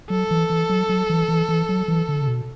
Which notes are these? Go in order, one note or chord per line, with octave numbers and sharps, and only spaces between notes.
F#3 A4
E3
E3
F#3
F#3
E3
E3
E3
F#3
E3
D3
C#3
B2